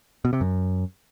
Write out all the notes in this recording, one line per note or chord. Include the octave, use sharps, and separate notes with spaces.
B2
C3
F#2